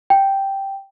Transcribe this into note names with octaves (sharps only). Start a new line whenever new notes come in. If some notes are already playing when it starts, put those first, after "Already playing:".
G5